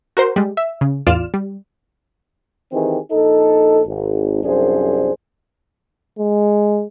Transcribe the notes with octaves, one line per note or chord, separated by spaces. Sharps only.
F#4 A#4 C5
G3 G#3
E5
C#3
A1 E2 F4 D5 F6 E7
G3
D#3 E3 C4 G4 G#4
A#1 D#4 A4
G#1
C2 F#2 D4 G#4 C5
G#3